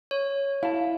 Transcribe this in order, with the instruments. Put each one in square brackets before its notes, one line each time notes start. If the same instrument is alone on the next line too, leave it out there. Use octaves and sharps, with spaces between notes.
[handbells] C#5
[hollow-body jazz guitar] E4 A5 [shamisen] F5